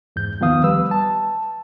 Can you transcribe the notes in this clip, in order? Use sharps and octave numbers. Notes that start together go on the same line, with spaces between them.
E2 G#2 G6
D2 D#3 F3 B3 F5 D#6
G3 B4 E6
A5